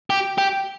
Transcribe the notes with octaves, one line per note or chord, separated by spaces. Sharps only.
G4
G4